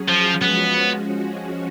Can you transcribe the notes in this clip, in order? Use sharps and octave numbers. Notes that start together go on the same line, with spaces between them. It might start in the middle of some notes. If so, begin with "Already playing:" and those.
Already playing: F#3 C#4 G#4
F3
F3 G#3 B3 C#4 F#4